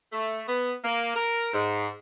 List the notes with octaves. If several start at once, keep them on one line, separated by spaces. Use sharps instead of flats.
A3
B3
A#3
A#4
G#2